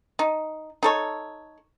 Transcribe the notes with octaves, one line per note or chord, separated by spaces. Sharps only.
D#4
D#4 A4 C#5